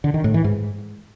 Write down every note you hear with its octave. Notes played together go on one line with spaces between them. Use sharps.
D3
D#3
A2
E3
G#2